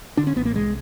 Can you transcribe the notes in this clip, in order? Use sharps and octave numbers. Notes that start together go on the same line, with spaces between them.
D3 D4
C#4
A1 B3
A#3
C2 G#3